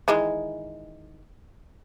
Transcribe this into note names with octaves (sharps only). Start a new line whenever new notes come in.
D#3 E3 G#3